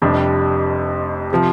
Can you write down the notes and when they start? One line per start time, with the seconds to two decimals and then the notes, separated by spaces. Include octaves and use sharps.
0.02 F1 F2 C3 G3 D4
1.33 C3 F3